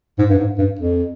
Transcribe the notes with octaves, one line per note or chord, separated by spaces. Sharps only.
G#2
G2
G#2
G2
F2